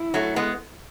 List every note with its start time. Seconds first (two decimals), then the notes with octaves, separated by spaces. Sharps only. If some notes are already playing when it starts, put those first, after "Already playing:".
Already playing: E4
0.14 F#3 A3
0.36 G#3 B3